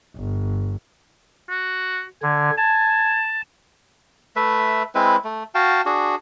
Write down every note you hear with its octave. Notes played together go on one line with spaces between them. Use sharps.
G1
F#4
D3 G#5
G#5 A5
A3 B4 E5
G#3 C4 E4 B4
A3
F#4 F5 G5 A5
D4 F#4 G#4